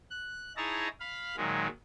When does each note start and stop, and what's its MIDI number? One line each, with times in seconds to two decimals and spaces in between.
0.10 0.53 90
0.57 0.88 63
0.57 0.88 64
0.57 0.88 68
0.57 0.88 73
0.57 0.88 81
0.57 0.88 82
1.00 1.36 77
1.00 1.36 83
1.37 1.67 46
1.37 1.67 51
1.37 1.67 54
1.37 1.67 56